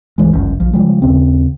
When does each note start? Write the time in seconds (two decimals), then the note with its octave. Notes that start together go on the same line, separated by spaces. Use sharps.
0.18 C2 G2 E3 G#3
0.33 G1 C#2 F#2
0.60 A#1 F3
0.73 C#3 F3 G3 G#3
1.02 D#2 C#3 C4